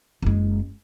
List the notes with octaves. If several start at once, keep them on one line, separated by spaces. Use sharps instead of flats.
F#1 G#3